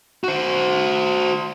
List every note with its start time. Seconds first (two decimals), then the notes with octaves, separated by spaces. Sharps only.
0.24 F#4 C5